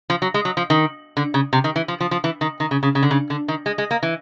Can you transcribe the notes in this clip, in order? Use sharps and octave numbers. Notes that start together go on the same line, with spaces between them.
F3
F#3
G#3
F#3
F3
D#3
D3
C#3
C3
D#3
E3
F3
F3
F3
E3
D#3
D#3
C#3
C#3
C#3
D3
C#3
D3
D#3
G#3
G#3
A#3
E3